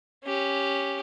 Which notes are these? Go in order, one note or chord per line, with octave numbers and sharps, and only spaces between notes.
C#4 G4